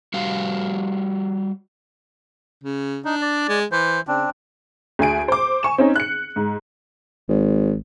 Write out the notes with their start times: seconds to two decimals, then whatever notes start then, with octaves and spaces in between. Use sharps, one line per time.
0.14 G3 F#4 G4 F5
2.64 C#3
3.05 D4 D#4
3.21 D5
3.49 G#3
3.72 E3 C5
4.07 C#3 C4 D4
4.99 D2 G#4 G#5 D7
5.28 C5 D6
5.63 G#5 C#6 E7
5.78 C4 C#4 D#4
5.96 F#6 C#7
6.36 G#2
7.29 G#1